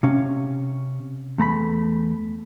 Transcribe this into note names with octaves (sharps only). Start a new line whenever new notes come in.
C3 C#4 F5
E2 A3 A#5 B5